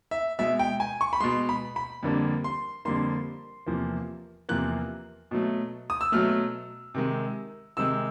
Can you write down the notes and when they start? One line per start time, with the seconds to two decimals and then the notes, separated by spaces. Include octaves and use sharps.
0.11 E5
0.39 B2 G#3 E5
0.59 G5
0.80 G#5
1.01 C#6
1.13 B5
1.20 B2 G#3 C6
1.49 B5
1.76 B5
2.03 F2 D3 G3 A#3
2.44 C6
2.85 F2 D3 G3 A#3 C6
3.67 E2 C3 F3 A#3
4.49 E2 C3 F3 A#3 F#6
5.31 B2 F#3 A3
5.90 D#6
6.01 E6
6.12 B2 F#3 A3 F6
6.95 C3 D#3 G#3
7.77 C3 D#3 G#3 E6